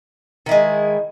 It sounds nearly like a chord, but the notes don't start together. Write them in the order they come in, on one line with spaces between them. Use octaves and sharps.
D#3 E4 G#3